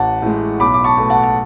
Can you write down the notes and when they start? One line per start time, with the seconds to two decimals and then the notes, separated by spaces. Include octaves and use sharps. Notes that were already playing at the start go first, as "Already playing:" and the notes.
Already playing: A1 F#5 A5
0.22 A2 G#3
0.59 B1 B5 D6
0.74 D6
0.84 A5 C#6
0.97 B2 A3
1.10 F#5 A5
1.23 A5